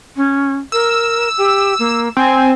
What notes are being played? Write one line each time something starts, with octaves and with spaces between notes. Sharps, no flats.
C#4
A#4 E6
G4
A#3
C4 G#5